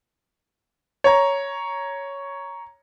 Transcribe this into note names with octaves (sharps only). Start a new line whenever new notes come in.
C#5 A#5